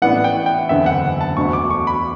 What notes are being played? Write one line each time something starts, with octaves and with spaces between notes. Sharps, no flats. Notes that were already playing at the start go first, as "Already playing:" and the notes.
A1 A2 E3 B3 D4 F#5
G5
G5
F#1 E2 D3 E5
F#5
A5
E1 D2 D3 C#6
D6
C#6
B5